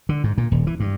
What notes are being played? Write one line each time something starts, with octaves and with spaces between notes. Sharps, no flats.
D3
G#2
A#2
D#1
E3
G2